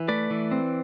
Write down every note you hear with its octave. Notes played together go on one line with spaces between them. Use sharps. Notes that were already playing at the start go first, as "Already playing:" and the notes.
Already playing: E3
A3 B4 D5
E3
C4